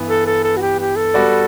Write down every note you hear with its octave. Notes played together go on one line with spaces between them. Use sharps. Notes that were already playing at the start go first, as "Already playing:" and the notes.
Already playing: G2 E3 B3
A4
A4
A4
F#4
G4
G4
A4
G3 B3 F#4 B4 D5